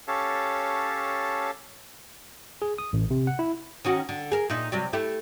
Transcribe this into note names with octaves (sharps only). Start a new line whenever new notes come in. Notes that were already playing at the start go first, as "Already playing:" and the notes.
C#4 G4 A4 C#5 F5 A5
G#4
D#6
A1
C3
F#5
E4
D#3 C#4 F#4
D3
G#4 A#4
A#2 D#4 E4
C3 F#3 G3
A3 E4 G4